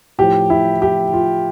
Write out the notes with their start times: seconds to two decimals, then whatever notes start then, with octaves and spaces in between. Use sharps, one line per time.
0.18 A2 F3 G4
0.50 E4
0.82 G4
1.13 F4